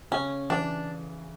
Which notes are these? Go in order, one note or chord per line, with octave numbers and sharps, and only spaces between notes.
C#3 C#4
E3 D4